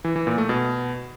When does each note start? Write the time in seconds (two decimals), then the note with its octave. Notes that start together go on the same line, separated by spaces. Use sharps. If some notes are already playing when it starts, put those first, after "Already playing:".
0.05 E3
0.16 E3
0.27 A#2
0.38 A3
0.49 B2